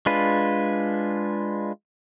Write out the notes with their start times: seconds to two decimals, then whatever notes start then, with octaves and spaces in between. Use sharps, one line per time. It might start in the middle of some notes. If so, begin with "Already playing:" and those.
0.06 G#3 D4 F4 B4